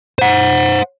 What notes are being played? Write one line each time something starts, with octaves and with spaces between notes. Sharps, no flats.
C5 F#5